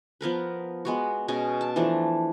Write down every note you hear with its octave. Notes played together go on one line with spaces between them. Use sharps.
F3 B3 A#4 B4
G#3 B3 F#4
B2 C#4 G#4 D#5
A5
E3 F3 A3 D4